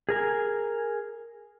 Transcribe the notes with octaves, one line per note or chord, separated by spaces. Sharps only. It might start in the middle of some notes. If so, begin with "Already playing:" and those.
G#4 A#4 G#5